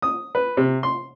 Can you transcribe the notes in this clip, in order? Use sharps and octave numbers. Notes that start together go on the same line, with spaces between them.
D#6
B4
C3
C6